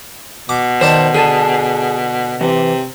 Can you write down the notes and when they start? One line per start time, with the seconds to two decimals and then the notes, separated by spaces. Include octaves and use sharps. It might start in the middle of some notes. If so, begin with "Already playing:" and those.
0.49 B2 D6
0.81 D#3 C5 D5 A5
1.15 D3 G#4 G#5 A5
2.41 C3 E3